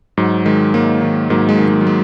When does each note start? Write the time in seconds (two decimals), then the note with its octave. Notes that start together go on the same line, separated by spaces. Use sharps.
0.17 G#2 F#3
0.46 D#3 G#3
0.74 G#2 F#3 A#3
1.02 D#3
1.30 G#2 F#3 A#3
1.49 G#3
1.59 D#3
1.68 G#3
1.81 F#3
1.87 G#3